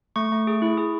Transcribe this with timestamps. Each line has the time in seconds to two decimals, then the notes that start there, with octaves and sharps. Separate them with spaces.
0.16 A3 C#6
0.32 A3
0.47 G#4
0.62 E4
0.77 G#4